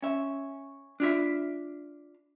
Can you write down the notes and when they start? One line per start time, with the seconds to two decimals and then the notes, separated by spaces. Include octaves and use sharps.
0.02 C#4 E5
1.00 D4 F4 E5